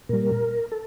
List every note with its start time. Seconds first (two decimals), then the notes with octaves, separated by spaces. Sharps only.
0.09 A#2 G3 A#4
0.72 A4